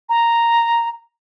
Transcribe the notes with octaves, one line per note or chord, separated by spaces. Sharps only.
A#5